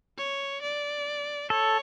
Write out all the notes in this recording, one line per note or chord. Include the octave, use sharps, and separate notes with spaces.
C#5
D5
A4 C#5